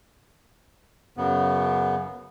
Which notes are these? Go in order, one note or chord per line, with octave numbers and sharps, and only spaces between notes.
F#2 C#3 B3